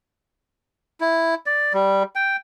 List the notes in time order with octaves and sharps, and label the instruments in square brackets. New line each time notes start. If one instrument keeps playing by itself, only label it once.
[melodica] E4
D5
G3
G5